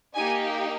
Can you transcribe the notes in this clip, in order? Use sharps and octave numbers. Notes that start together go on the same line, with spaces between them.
A#3 D#4 G4 G#5